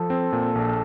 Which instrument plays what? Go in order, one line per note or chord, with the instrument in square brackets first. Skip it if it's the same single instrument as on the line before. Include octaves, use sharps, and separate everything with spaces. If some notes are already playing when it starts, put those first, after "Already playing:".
Already playing: [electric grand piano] F3 [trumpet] A4
[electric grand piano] C4
A#2
A#1